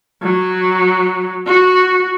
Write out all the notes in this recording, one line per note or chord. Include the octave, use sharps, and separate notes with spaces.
F#3
F#4